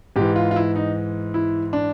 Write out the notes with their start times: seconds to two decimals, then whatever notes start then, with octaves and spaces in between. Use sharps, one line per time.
0.16 G#2 E3 G4
0.36 F4
0.51 F4
0.56 E4
0.76 D#4
1.34 E4
1.73 D4